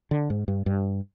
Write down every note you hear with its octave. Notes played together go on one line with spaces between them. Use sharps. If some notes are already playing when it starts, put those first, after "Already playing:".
D3
G#2
G2
G2